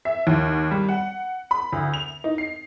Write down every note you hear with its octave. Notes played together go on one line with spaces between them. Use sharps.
E5
D#2
G3
F#5
B5
D2
F7
D#4
C7